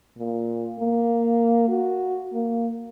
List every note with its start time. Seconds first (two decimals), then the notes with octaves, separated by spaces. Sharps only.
0.17 A#2
0.79 A#3
1.68 F#4
2.33 A#3